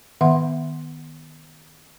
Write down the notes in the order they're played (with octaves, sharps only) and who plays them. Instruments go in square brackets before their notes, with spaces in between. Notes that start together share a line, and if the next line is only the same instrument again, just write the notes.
[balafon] D#3 B3 E5 F#5 C6